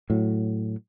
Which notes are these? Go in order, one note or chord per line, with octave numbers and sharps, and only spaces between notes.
A2 F#3